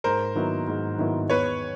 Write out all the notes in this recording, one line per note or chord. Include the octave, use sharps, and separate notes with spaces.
G#2 A#4 C5
D#3 F#3 B3 E4
G#2
D#3 F#3 B3 E4
E2 B4 C#5